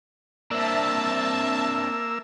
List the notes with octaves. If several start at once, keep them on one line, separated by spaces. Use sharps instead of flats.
A#3 C4 D4 E5 A5 E6